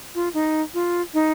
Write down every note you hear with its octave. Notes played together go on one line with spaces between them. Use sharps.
F4
D#4
F4
D#4